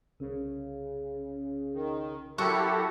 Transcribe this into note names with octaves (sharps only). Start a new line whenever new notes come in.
C2 C#3
D#3
F#3 E4 F#4 G4 A4 A#4